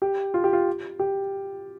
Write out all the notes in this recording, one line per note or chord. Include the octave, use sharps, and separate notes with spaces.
G4
F4
G4
F4
G4